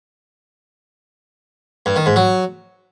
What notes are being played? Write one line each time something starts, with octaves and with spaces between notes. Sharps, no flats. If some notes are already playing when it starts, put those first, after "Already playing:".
G2
D#3
G#2
F#3